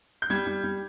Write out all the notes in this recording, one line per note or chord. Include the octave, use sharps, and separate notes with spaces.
G6
G3 G#6
G3
G3